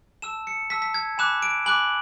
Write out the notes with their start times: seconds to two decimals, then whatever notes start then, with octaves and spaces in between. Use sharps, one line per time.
0.22 A5 E6 E7
0.47 C#7
0.70 A5 E6 B6
0.82 B6
0.94 G#6
1.18 G#5 B5 D6 F#6 E7
1.42 D7
1.66 G#5 B5 D6 F#6 F#7